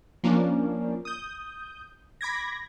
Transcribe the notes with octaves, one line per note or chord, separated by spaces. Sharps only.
F3 A#3 C#4 D4
D#6 G6
B5 D6 G#6 A#6